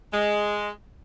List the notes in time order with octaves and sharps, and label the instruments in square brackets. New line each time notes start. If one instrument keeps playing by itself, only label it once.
[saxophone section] G#3